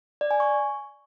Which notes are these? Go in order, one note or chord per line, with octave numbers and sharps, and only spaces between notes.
D5
G#5
C#6